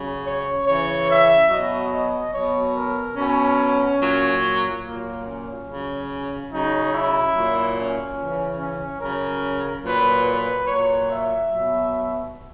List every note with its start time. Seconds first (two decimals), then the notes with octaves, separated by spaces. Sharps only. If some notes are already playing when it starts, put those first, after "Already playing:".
Already playing: C#3 F#3
0.24 C#5
0.66 C#3 E3 C#5
1.07 E5
1.49 B2 F#3 D#5
1.91 D#5
2.32 B2 F#3 C#5
2.74 A#4
3.16 B2 F#3 C#4
4.00 A#2 F#3
4.83 A#2 F#3 A#3
5.24 C#4
5.67 C#3 F#3
6.50 C#3 F#3 D#4
6.92 E4
7.33 A#2 F#3
7.75 C#4
8.16 C#3 E3
8.58 C#4
8.99 C#3 F#3 A#4
9.83 A#2 F#3 B4
10.24 B4
10.66 A#2 F#3 C#5
11.09 E5
11.50 B2 F#3